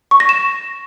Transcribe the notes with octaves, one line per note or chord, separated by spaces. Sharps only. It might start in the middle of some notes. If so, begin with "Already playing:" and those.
C#6
A#6
E7